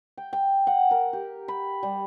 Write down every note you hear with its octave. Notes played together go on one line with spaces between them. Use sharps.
G5
G5
F#5
A#4
G4
B5
G3